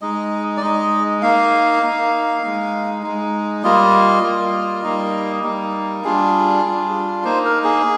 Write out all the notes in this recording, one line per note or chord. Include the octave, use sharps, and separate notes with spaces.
G#3 D#4 D#5
D5
G#3 D#4 D#5
A#3 D#4 F5
A#3 D#4
G#3 D#4
G#3 D#4
G3 A#3 F4 D#5
G3 A#3 F4
G3 A#3 D#4
G3 A#3 D#4
G3 D4 F4 G#4
G3 D4 F4
A#3 D#4 C5
A#4
G#4